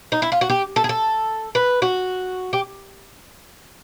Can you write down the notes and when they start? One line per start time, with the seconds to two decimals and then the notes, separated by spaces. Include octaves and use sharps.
0.12 D#4
0.22 E4
0.32 F4
0.41 F#4
0.50 G4
0.76 A4
0.84 G#4
0.89 A4
1.55 B4
1.82 F#4
2.53 G4